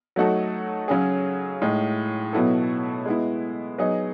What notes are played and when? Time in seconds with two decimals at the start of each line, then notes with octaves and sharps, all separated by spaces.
0.16 F#3 A3 D#4 F#4 A4
0.88 C#3 F#3 C#4 G#4
1.62 A2 G#3 D#4
2.33 B2 F#3 B3 E4 A4
3.05 G#3 B3 E4
3.78 F#3 B3 D#4 G#4 D#5